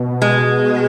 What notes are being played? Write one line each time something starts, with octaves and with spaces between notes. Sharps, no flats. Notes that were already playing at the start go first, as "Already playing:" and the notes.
Already playing: B2
G#3